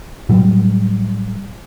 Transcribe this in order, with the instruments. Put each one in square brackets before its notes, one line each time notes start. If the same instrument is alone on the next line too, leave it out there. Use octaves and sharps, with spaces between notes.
[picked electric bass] A2 F#3 G3